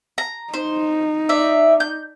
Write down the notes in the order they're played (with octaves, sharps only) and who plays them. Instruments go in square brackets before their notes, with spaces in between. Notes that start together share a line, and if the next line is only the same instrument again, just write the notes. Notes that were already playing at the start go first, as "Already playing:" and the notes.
[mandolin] A#5
[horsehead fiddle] D#4 [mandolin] C5
[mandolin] D5 E5
G6